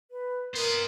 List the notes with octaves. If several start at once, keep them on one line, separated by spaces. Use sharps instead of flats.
B4
B3 A#4 C5 D#5